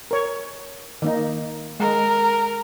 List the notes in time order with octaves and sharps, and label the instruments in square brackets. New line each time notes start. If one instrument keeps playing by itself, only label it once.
[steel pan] A#4 C#5
D#3 A#3 D#4
[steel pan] G#3 [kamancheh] A#4